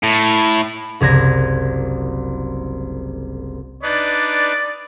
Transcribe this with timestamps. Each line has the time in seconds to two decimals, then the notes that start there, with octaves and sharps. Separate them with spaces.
0.03 A2
1.00 F#1 C2 G#6 A#6
3.83 D4 D#4 B4 D5